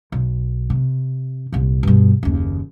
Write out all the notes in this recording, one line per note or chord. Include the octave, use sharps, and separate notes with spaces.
B1
C3
C2 A#2
G2 B2
F#1 D#2